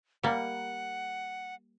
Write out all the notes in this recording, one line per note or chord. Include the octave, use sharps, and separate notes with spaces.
G3 A#3 F#5